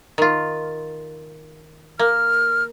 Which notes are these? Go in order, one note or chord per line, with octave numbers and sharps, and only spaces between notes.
D#3 F4
A#3 F6